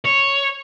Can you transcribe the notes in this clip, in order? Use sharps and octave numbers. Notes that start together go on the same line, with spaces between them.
C#5